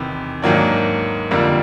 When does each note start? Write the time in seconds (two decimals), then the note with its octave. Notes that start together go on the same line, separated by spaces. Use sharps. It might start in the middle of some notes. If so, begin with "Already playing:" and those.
Already playing: E2 C3 D#3
0.42 G#2 D#3 F#3 A#3 D4
1.31 F2 D3 G3 A#3